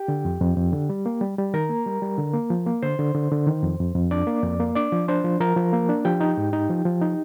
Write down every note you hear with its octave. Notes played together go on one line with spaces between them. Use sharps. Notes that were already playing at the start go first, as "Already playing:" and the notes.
Already playing: G4 G5
D3
F2
F2
F2
D3
G3
A#3
G3
G3
D#3 A#4 A#5
A#3
G3
G3
D3
A#3
F3
A#3
D3 C5 C6
D3
D3
D3
D#3
F2
F2
F2
D4 D5 D6
A#3
F2
A#3
D4 D5 D6
F3
D4 C5 C6
F3
F3 A#4 A#5
F3
A#3
D4
F3 G4 G5
D#4
G#2
D#4
F3
F3
D#4